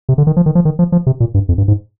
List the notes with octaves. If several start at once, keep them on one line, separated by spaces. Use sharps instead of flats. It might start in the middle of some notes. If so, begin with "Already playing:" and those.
C3
D3
D#3
F3
D#3
F3
D#3
F3
F3
C3
A#2
G2
F2
G2
G#2